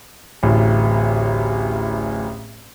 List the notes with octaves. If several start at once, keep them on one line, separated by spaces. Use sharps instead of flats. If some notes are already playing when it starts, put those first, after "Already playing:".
D1 A1